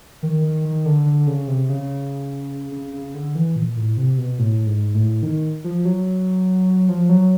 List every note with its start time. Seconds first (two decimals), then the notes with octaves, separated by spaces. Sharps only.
0.23 D#3
0.44 D#3
0.65 D#3
0.86 D3
1.06 D3
1.27 C#3
1.48 C3
1.69 C#3
2.72 C#3
2.94 C#3
3.14 D3
3.35 E3
3.56 A#2
3.77 A2
3.97 C3
4.18 B2
4.39 A2
4.66 G#2
4.94 A2
5.23 D#3
5.64 F3
5.85 F#3
6.89 F3
7.09 F#3